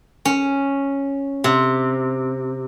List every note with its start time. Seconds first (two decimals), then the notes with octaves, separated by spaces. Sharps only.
0.25 C#4
1.44 C3